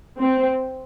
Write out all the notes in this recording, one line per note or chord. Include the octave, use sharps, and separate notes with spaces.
C4